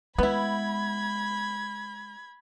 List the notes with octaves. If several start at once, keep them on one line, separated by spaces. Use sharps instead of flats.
G#3 B3 E4 B5 G#6